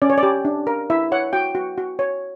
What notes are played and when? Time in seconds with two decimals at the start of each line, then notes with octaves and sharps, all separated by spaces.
0.02 C#4 D5
0.10 C#5
0.18 D5
0.23 G4
0.45 D4
0.67 A#4
0.90 E4 E5
1.12 C#5 F#5
1.33 F#4 G5
1.55 F#4
1.78 F#4
1.99 C#5